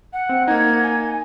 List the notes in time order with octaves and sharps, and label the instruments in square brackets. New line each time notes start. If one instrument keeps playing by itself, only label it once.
[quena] F#5
[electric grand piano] C4
[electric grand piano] A#3 D#4 [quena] G#6
[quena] G#5